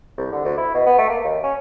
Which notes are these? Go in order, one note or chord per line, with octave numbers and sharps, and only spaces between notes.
C2
D3
D2
E4
B2
B3
A3
A#3
D#2
C#4